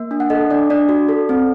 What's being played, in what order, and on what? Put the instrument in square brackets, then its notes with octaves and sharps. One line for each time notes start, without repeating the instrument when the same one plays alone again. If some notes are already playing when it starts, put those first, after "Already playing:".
Already playing: [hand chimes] A#3
D4
F#5
A4 D#5
D4 D5
D4 D5
F#4
A4
C4